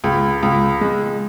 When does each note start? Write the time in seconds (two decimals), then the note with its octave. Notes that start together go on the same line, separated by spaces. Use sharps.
0.04 C#2
0.43 C#2
0.81 G#3